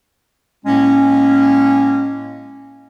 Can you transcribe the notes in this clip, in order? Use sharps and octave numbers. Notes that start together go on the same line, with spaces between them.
A2 G#3 A#3 C#4